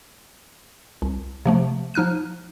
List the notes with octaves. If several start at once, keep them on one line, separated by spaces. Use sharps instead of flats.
C2
C3 F3 A3
F3 D#4 F6 F#6 D#7